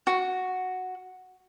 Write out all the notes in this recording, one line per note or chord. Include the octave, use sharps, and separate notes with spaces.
F#4